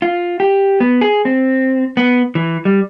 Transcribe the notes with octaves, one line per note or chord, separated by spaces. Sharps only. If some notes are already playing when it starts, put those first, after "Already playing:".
F4
G4
B3
G#4
C4
B3
E3
G3